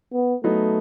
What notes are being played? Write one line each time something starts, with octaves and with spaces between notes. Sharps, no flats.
B3
F#3 A3 B3 D#4